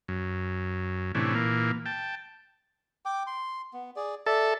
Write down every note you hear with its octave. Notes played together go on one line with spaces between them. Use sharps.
F#2
A2 C3 E3 C#4 D4
A#2 E3 A#3
G5 A5
G5 D6
C6
B3
G#4 D5
A4 D5 E5